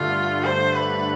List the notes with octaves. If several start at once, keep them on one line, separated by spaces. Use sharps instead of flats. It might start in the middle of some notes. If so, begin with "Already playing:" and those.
Already playing: G2 D3 A3 F4
C5
B4